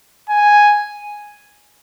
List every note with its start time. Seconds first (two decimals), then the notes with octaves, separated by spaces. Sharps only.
0.29 G#5